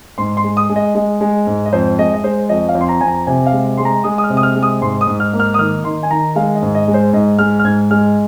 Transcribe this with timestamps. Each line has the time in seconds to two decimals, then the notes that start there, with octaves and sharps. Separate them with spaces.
0.18 G#2 C6
0.37 C6
0.44 G#3
0.57 D#6
0.70 G#3
0.76 D#5
0.95 G#3 D#5
1.21 G#3
1.47 G#2
1.66 D#5
1.73 F2 C5
1.99 G#3 D#5
2.14 D#5
2.24 G#3 C5
2.49 F2 D#5
2.69 F5
2.75 F2
2.81 C6
2.89 A#5
3.01 F2 G#5
3.08 A#5
3.27 C3 G#5
3.46 F5
3.53 G#3
3.78 G#3 C6
3.85 A#5
4.04 G#3 D#6
4.18 D#6
4.24 F6
4.30 C3
4.37 D#6
4.43 F6
4.55 G#3
4.63 D#6
4.81 G#2 C6
5.01 D#6
5.07 G#2
5.20 F6
5.33 A#3
5.40 F6
5.54 D#6
5.59 D#3 F6
5.84 D#3 C6
6.03 G#5
6.10 D#3 A#5
6.36 G#3 F5
6.55 D#5
6.62 G#2
6.75 D#5
6.88 G#3
6.94 C5
7.13 G#2 D#5
7.39 G#3 F6
7.59 F6
7.64 G#2 G#6
7.91 G#3 F6